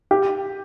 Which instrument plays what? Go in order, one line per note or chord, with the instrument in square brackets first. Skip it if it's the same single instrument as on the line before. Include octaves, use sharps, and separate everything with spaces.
[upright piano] G4